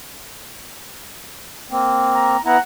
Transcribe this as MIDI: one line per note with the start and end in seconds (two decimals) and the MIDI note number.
1.71 2.37 58
1.71 2.37 60
2.14 2.44 82
2.45 2.57 59
2.45 2.57 64
2.45 2.58 78
2.45 2.58 82